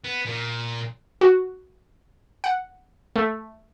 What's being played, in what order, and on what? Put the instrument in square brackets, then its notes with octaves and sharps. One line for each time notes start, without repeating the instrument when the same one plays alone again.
[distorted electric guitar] B3
A#2
[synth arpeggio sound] F#4
F#5
A3